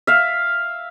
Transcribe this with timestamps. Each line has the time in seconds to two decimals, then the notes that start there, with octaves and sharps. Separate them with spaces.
0.07 E5 F5